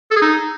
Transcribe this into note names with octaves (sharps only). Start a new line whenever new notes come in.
A4
G#4
D#4